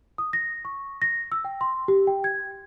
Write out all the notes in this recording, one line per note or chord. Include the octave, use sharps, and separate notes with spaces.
D#6
A#6
C#6
A#6
E6
G5
C6
G4
G5
G#6